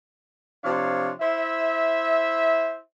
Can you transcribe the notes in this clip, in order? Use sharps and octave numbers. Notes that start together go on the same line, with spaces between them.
C3 F3 D4 C#5 F5
E4 C5 E5